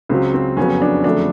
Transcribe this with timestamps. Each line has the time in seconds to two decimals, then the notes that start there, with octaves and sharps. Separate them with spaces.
0.09 C#2 C#3 F#3 C4
0.34 C4
0.57 F#1 F2 C#3 F#3 B3 C#4
0.82 D4
1.04 F#1 F2 D3 F#3 A3 D4